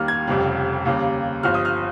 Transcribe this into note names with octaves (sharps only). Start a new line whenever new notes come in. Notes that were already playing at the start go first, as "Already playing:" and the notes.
Already playing: D#2 D#3 G3 A#3 F6
G#6
F1 F2 C#3 G3
D#2 C#3 G3 A#3
G1 G2 F3 F6
D#6
F6